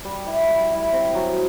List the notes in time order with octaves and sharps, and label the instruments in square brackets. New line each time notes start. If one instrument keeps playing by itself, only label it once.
[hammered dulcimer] G3
E4
G3
E4
C4
F#3